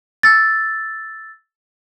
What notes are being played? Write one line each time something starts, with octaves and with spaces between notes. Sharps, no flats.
E6 A6